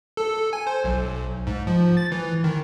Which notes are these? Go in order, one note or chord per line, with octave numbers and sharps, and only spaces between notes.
A4
G#5
C5
B1
G#2
F3
A6
E3
D#3